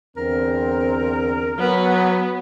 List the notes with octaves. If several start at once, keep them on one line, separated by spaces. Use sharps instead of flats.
E2 D3 C4 A#4
F#3 B3